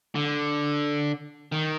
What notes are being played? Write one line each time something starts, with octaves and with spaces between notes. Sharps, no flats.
D3
D#3